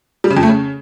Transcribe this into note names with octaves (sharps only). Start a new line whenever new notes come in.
G3
C#3
F2
A3
C#3